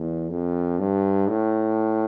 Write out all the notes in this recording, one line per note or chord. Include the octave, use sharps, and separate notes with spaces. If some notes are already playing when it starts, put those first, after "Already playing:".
Already playing: E2
F2
G2
A2